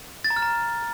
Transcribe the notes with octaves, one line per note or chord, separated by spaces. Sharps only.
A6
A#5
F6
A#5